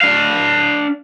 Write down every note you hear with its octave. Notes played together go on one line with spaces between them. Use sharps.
D4 F5